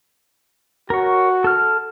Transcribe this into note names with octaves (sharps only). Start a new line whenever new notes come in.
F#4 A#4 C#5
A4 F6